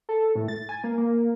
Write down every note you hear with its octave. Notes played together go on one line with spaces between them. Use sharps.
A4
A2
A6
G#5
A#3
A#3